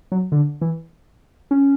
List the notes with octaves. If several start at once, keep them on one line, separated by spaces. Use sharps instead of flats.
F#3
D3
E3
C#4